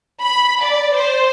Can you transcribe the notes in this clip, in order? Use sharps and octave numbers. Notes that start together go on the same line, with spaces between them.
B5
D5
C5